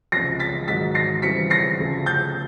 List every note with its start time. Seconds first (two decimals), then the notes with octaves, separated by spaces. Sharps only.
0.12 C#2 C3 F3 A#6 C7
0.40 A6 B6
0.67 G#2 D#3 F#3 A6 B6
0.95 A#6 C7
1.22 C#3 E3 G3 C4 F4 B6 C#7
1.50 A#6 C7
1.78 D2 C#3 F3 A3
2.06 G6 A6